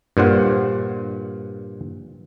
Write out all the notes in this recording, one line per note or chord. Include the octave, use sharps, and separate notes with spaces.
G2 A#2 C5 F#5